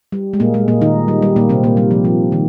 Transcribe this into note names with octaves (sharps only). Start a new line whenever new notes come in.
G3
G#3
A#2 A#3
G#3
A#2 A#3
D#3 D#4
G3
G3
A#2 A#3
C3 C4
A#2 A#3
G3
F3
F3
D#3